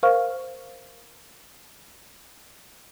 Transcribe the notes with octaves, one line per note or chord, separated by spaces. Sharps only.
A#4 C5 F5 C#6 F6